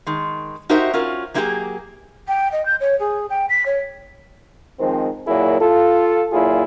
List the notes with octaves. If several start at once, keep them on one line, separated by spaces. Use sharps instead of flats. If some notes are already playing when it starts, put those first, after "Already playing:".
D#3 G#3
D#4 F#4 G4 A#4 C5 E5
C#4 F4 F#4 A#4
F#3 A#3 D#4 E4 G4 G#4
G5
D#5
G6
C#5
G#4
G5
B6
C#5
D#3 F3 G#3 C4
A#2 F#3 E4 G#4 A#4
F4 A4
A#2 F#3 E4 F4 G#4